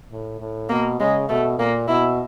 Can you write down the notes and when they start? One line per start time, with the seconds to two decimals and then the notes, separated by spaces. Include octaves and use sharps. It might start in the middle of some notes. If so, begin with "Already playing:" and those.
0.11 A2
0.40 A2
0.69 B2 A#3
0.99 C#3 G#3
1.29 B2 A3
1.58 A#2 A#3
1.88 B2 E4